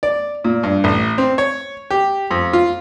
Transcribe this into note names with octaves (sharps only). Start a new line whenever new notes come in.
D5
A#2
G2
A1
C4
C#5
G4
F2
F4